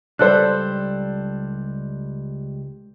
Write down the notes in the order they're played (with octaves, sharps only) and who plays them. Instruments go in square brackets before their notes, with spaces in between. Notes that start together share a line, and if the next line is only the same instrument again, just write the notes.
[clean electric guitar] C#2 G3 B5 [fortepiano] D4 A4 C5 [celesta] D5 F#6